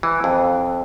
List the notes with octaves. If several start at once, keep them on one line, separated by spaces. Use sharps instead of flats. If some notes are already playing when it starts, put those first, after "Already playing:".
E3
F2